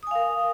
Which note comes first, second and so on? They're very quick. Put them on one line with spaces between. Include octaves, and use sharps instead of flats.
D#6 G#5 F5 A#4